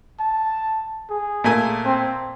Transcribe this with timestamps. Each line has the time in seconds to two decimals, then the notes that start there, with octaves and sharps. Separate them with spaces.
0.20 A5
1.10 G#4
1.44 A#2 A3 G#5
1.85 C4